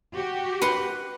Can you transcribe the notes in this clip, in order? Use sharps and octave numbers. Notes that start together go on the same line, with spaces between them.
F#4 G4
B4 F#5 C6